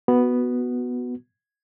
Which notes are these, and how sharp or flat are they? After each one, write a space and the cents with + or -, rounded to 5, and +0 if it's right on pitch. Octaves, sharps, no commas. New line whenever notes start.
B3 +0 F#4 +0